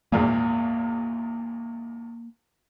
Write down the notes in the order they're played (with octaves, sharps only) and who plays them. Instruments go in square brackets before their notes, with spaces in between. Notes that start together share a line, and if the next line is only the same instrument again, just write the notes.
[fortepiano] G#1 E2 A#2 [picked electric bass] A#3